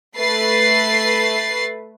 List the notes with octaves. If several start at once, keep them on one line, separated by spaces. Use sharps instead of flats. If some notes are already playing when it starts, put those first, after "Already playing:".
A3 B4 A6 C7